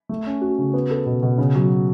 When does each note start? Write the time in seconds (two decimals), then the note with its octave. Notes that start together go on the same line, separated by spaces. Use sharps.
0.09 A3
0.26 C#4
0.41 F#4
0.59 C#3
0.74 B3
0.91 A4
1.06 B2
1.23 B2
1.38 C#3
1.55 F#3